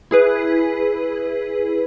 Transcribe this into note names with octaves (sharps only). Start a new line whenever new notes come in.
E4 G#4 B4